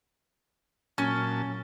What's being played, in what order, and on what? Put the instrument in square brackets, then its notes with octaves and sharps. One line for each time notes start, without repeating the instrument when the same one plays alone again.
[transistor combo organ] A#2 F#3 A5 [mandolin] C#4